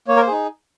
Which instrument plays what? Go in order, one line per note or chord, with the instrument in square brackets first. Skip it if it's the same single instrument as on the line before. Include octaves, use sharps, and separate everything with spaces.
[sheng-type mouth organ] A#3 C#5
A#4
C5
D#4 G#4